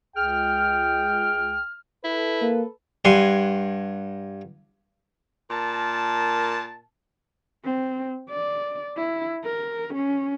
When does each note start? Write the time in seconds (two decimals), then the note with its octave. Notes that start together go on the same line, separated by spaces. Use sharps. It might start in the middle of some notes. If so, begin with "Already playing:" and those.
0.16 C#2 G#4 G5 F6
2.04 E4 A4 B4
2.42 A#3
3.05 G2 F#5 G#5 C6
5.50 A#2 A#4 A5
7.64 C4
8.30 D5
8.97 E4
9.45 A#4
9.94 C#4